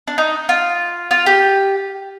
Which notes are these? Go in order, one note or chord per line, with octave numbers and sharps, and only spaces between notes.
D4
D#4
F4
F4
G4